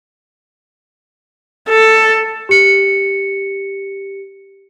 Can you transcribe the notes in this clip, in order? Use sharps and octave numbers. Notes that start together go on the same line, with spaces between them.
A4
G4 C#7